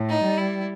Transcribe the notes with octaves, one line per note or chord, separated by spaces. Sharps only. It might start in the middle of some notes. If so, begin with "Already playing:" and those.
Already playing: A2
D#4
G3
E4